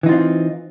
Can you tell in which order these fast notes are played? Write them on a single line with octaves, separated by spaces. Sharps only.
E3 D#4 F4 C4